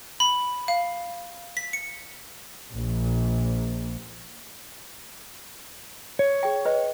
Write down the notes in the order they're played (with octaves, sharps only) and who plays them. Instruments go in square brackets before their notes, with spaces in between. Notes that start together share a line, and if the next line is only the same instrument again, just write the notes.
[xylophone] B5
F5
B6
C#7
[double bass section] A#1
[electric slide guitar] C#5
[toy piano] G#4 G5
B4 C5 D#5